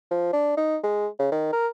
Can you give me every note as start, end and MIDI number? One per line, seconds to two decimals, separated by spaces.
0.11 0.29 53
0.33 0.53 62
0.57 0.77 63
0.83 1.07 56
1.19 1.27 49
1.32 1.50 51
1.52 1.67 70